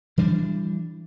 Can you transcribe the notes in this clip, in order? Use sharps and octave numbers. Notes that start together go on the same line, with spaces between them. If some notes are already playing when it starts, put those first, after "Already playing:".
E3 G3 D4